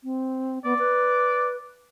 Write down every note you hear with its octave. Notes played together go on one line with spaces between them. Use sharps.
C4
B3 D5
B4